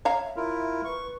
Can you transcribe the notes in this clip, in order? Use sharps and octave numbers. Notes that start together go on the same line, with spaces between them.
C#5 F5 A#5
E5
E4 F4 A#4
B4 C#6